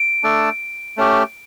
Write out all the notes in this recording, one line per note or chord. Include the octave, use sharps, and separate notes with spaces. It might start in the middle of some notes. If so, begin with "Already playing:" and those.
Already playing: D7
A3 D4 A4
A3 C#4 G4